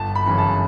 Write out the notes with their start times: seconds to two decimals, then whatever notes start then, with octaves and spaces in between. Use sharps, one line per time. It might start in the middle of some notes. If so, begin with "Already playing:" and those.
Already playing: G1 A5
0.15 B5
0.26 F#2 C#3 E3
0.38 A5